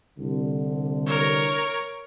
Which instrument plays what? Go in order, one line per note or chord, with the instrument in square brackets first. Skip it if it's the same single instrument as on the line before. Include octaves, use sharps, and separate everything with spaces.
[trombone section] C2 D3
[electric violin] A#4 C#5